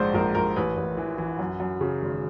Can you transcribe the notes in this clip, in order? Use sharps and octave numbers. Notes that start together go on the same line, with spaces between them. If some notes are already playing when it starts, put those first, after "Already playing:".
Already playing: A#1 G#2 C5 D5
A#1 A#4
A#1 A#4
A1 B4
A1
E3
E3
F#2
F#2
C#3
G#1